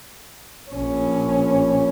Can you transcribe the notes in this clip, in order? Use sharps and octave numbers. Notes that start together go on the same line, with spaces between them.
A#1 C#4